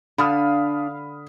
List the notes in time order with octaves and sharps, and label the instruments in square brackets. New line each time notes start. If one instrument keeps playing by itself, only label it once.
[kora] D3 [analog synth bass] D4 [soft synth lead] F5 [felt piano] B5 D#6 F6